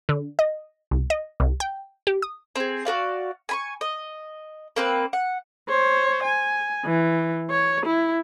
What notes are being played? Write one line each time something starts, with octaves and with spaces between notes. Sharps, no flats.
D3
D#5
C2
D#5
C2
G5
G4
D#6
C4 G#4
F#4 A#4 D5 F5
G#5 B5 C#6
D#5
A#3 C4 B4
F#5
C5 C#5
G#5
E3
C#5
E4